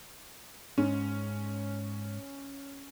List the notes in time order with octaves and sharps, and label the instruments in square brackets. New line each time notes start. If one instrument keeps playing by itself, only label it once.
[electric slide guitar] G#2 [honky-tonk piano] C#4